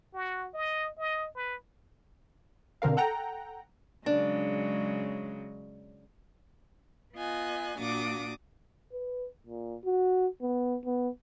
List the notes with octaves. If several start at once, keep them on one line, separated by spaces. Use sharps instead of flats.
F#4
D#5
D#5
B4
B2 D3 C4 A#4 F5
A4 F#5 G5 A#5
C#3 F#3 G#3 D4
B3 F4 D#5 G#5 F#6
A#2 A#3 D4 F#4 D6 D#6
B4
A#2
F#4
B3
B3